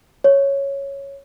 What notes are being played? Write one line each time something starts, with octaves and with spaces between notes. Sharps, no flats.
C#5